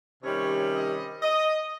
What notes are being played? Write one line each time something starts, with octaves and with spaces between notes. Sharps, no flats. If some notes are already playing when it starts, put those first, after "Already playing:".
C3 D#3 G3 C#4 C#5
D#5
D#5